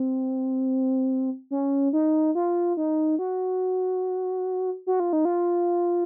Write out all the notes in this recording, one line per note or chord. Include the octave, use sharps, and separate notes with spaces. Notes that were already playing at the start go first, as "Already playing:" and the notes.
Already playing: C4
C#4
D#4
F4
D#4
F#4
F#4
F4
D#4
F4